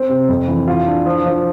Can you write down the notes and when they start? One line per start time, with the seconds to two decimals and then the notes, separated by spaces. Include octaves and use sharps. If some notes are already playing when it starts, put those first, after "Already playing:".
Already playing: C4
0.10 C3
0.29 F2
0.48 E3
0.68 F4
0.87 D4
1.06 F3
1.26 F3